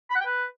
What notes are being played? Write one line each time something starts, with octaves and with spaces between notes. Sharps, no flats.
B5
F#5
G5
B4